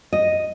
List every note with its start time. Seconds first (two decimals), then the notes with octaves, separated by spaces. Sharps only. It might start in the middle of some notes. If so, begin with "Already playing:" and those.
0.13 D#5